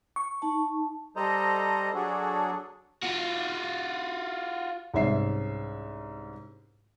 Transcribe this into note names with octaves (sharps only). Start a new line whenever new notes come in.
C#6
D#4 A5
G3 A4 C5 D#5 A#5
F#3 D4 F#4 G#4 A4
F4 F#4
C2 G#2 C#4 E5 C7